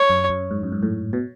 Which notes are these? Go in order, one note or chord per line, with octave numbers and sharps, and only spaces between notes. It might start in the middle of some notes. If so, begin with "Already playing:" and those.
Already playing: C#5
F#2
F#2
G#2
F#2
G#2
A2
B2